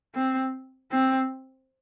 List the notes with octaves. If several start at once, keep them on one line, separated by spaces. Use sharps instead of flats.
C4
C4